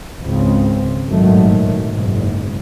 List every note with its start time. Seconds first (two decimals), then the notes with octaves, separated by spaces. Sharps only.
0.21 G#1 C#2 C#3 C4
1.09 G#1 G2 A#2 D#3 F#3 A3
1.83 F#1 B1 G#2